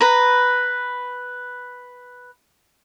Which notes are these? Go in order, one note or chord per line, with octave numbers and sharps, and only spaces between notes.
B4 A#5